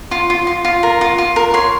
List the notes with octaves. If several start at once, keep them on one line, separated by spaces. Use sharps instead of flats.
F4
F4
F4
F4
A#4
F4
F4
A#4
C#5 C6